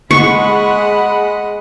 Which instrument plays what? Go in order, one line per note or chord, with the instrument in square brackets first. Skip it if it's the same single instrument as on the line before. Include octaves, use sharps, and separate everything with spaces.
[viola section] G#3 F#5 B5 [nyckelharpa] D#5 [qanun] C#6